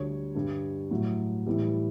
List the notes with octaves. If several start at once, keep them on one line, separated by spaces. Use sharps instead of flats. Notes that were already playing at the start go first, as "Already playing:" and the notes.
Already playing: D2 D3 G3 C#5
G2 D3 G3
A2 F#3
A2 E3 G3